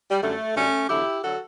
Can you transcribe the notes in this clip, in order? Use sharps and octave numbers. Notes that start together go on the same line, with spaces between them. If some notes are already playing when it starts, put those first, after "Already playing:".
G3
F#2 D3 G3 A3
F#2 D3 G3 A3 C#4
E2 D3 F#3 E4 G4
D3 F#3 F#4 A4